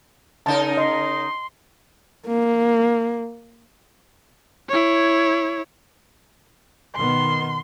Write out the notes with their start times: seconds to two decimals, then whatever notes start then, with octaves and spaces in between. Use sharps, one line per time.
0.46 C#3 D#4 A#4 A5
0.77 D#5 C6
2.27 A#3
4.69 E4 C#5
6.95 B2 D#3 B3 C6